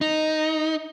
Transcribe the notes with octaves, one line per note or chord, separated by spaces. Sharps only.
D#4